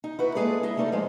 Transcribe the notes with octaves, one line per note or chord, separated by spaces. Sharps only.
D#4
E4 F#4 B4
G#3 A#3 G#4 A4 B4 D5
E4 G#4 D#5 E5
G3 A3 D#4 A4 D5
F3 G#3